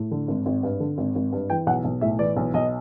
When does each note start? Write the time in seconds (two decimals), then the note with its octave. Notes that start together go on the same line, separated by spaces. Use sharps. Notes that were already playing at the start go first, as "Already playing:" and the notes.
Already playing: A2
0.11 D3
0.28 G#1
0.46 G#1
0.63 G2
0.80 D3
0.98 G#1
1.15 G#1
1.32 G2
1.50 E3 G5
1.67 B1 F#5
1.85 B1
2.01 A2 E5
2.19 E3 D5
2.37 B1
2.54 B1 D#5